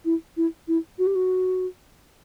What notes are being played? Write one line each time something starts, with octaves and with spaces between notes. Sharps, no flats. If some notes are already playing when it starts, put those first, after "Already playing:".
E4
E4
E4
F#4
G4
F#4